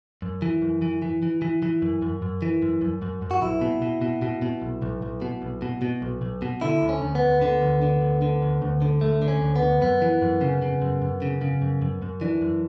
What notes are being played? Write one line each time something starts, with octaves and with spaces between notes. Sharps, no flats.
F#2
E3
F#2
E3
E3
E3
E3
E3
F#2
F#2
F#2
E3
F#2
F#2
F#2
F#2
F#4
B1 E4
B2
B2
B2
B2
B2
B1
B1
B1
B2
B1
B2
B2
B1
B1
B2
D3 E4
D2
C#4
D2
B3
D2
D3 B3
D2
D3
D2
D3
D2
D2
D3
D2 A3
D3
C#4
D2
B3
D2
F#2 B3
E3
F#2
C#3
C#3
F#2
F#2
C#3
C#3
F#2
F#2
F#2
E3 D4
F#2